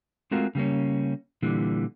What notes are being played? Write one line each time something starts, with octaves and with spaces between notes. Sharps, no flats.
G#3 A3 C4 F4 F#4 A#4
C#3 G3 A#3 C#4
A#2 D3 E3 G3